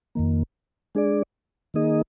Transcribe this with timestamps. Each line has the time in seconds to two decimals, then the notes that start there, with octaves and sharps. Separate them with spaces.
0.15 F2 D#3 A#3
0.95 G#3 D4 G#4 D5
1.74 D#3 A#3 D#4 G#4 D#5